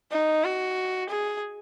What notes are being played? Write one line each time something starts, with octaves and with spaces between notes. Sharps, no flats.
D#4
F#4
G#4